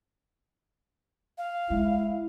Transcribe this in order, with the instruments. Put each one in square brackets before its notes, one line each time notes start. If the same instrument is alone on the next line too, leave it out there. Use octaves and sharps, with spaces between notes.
[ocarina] F5
[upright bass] G#3 [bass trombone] E4